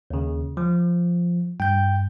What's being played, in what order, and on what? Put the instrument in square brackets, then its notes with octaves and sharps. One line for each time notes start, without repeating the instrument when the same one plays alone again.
[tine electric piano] D#2 C#3
F3
[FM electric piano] G2 [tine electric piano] G5 G6